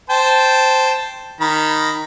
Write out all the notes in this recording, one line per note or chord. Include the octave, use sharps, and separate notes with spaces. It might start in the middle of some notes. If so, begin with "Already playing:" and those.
C5 G5 A5
D#3 A#5 B5